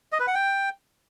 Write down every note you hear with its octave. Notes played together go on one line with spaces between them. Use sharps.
D#5
B4
F#5
G5